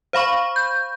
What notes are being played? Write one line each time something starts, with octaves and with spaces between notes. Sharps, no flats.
C5 F5 B5 C#6
G6